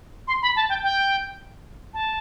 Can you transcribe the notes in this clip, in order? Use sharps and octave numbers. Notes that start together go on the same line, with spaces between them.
C6
B5
A5
G5
G5
A5